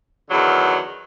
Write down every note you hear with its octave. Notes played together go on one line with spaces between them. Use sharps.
E2 D3 D#3 F#3